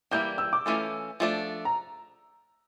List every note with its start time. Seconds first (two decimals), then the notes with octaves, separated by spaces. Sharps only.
0.11 E3 G3 A#3 E4 G6
0.38 E6
0.53 D6
0.66 E3 A3 C#4 F4 A4
1.20 F3 A3 D4
1.65 A#5